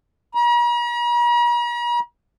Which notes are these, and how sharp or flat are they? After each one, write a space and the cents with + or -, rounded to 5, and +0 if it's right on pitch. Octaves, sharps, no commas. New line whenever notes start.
A#5 +45